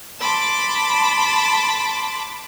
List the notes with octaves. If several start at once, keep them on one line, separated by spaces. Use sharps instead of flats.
A5 B5 C6 D6